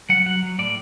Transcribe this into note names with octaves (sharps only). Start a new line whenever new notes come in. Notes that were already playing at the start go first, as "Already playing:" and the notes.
F#3 F#5
F#3 F#5
F#3
A2 D5